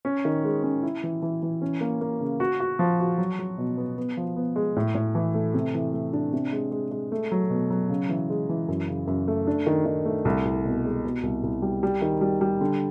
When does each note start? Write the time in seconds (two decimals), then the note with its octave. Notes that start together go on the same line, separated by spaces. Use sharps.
0.05 C#4
0.25 D#3
0.44 G#3
0.63 C#4
0.83 E4
1.03 E3
1.22 E3
1.42 E3
1.62 C#4
1.81 A#3
2.01 A#3
2.20 C#3
2.40 F#4
2.60 F#4
2.79 F3
3.00 F#4
3.18 F#3
3.39 F#3
3.58 B2
3.77 B3
3.98 B3
4.17 F3
4.36 B3
4.56 G#3
4.76 A2
4.95 A2
5.15 E3
5.34 A3
5.54 C3
5.74 E3
5.93 A3
6.13 D4
6.33 C3
6.52 G#3
6.71 G#3
6.91 G#3
7.12 A3
7.32 F#3
7.50 B2
7.71 F#3
7.89 C#3
8.09 E3
8.30 G#3
8.49 E3
8.68 F#2
8.88 C#3
9.07 F#2
9.28 A3
9.47 D4
9.66 D#3
9.86 D#3
10.05 A3
10.25 C2
10.45 C2
10.65 B2
10.85 G#3
11.04 B2
11.23 C2
11.43 C2
11.62 G3
11.83 G3
12.02 D#3
12.21 G3
12.41 G3
12.61 D3